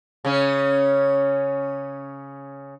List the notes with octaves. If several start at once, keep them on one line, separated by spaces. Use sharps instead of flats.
C#3 C#4